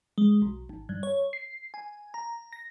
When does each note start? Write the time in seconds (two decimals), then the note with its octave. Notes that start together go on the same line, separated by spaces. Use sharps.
0.18 G#3
0.42 B1
0.69 G#1
0.89 G2
1.03 C#5
1.33 C7
1.74 G#5
2.14 A#5
2.53 A#6